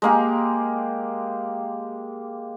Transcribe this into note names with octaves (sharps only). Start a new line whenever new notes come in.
G#3 A#3 G4